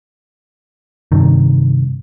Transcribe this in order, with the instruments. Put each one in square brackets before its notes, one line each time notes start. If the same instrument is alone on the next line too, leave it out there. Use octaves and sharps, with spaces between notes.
[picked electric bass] G2 C3 D#3